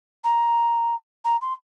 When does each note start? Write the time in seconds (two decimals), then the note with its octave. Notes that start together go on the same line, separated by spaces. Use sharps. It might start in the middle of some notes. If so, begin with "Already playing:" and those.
0.24 A#5
1.25 A#5
1.41 C6